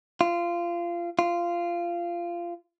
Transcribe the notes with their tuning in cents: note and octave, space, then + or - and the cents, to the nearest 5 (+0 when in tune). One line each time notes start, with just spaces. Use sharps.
F4 -20
F4 -15